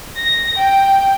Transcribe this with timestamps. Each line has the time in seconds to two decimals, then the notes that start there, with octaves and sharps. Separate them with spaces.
0.17 A#6
0.58 G5